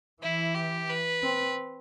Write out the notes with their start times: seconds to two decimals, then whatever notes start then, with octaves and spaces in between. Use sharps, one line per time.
0.22 E3 E4
0.55 G4
0.89 B4
1.23 C4